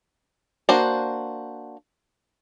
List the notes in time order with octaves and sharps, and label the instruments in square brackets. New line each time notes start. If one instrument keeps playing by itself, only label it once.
[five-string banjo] A#3 D4 F#4 C5